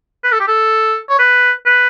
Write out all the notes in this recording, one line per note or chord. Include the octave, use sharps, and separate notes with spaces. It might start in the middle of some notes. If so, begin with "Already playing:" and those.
B4
A4
G4
A4
C#5
B4
B4